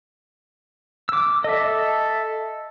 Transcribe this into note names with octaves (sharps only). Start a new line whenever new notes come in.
D6 E6
A4 D#5 E5